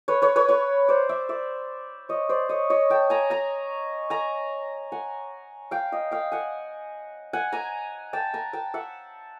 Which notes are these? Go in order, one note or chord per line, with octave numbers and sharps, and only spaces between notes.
B4 C#5
B4 C#5
B4 C#5
B4 C#5
C5 D5
D5 E5
D5 E5
C#5 D#5
C5 D5
C#5 D#5
C#5 D#5
G5 A5
G#5 A#5
G#5 A#5
G#5 A#5
F#5 G#5
F5 G5
D#5 F5
F5 G5
F#5 G#5
F#5 G#5
G#5 A#5
G5 A5
G#5 A#5
G5 A5
E5 F#5